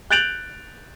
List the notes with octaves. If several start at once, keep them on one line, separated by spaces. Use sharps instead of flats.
F#6 G6 A6 D7 F7 F#7